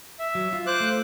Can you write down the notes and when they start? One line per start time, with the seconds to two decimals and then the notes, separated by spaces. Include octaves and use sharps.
0.19 E5
0.35 F#3
0.53 F4
0.67 C5 D6 F#6
0.80 A3